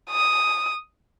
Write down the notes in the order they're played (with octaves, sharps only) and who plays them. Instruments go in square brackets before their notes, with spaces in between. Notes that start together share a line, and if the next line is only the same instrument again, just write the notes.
[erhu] D#6